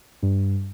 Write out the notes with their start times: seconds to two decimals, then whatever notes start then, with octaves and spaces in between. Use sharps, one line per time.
0.22 G2